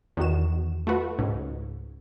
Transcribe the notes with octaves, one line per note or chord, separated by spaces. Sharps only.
E2 D#3 F#4 E7
A3 F4 F#4 B4
C#2 G#2